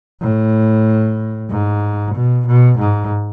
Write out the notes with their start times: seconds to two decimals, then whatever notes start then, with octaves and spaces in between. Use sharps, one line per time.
0.21 A2
1.50 G#2
2.15 B2
2.47 B2
2.79 G#2